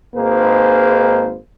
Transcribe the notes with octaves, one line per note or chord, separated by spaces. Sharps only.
G#1 G#2 A#3 G#4 B4 C5